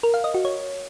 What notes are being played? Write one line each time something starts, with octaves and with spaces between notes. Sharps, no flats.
A#4
F5
D#5
F#4
C#5